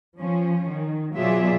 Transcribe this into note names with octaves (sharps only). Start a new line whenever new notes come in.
F3 C#4
D#3
B2 F#3 F4 G#4 D5 E5